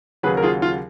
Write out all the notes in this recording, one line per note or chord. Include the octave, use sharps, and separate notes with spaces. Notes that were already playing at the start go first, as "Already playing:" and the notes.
D#2 C#3 F#3 G#4 B4
A#4
F4 G#4
F4